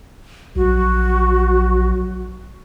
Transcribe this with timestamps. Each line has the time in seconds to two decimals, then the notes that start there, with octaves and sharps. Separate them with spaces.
0.56 A#1 F#3 F#4